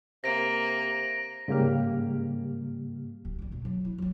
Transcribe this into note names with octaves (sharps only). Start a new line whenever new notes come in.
C3 A#3 A#6 D7
G#2 C#3 G3 A#3 G4 F6
D1
F3 G3
B2 D4
F#3
E4
F#3 F4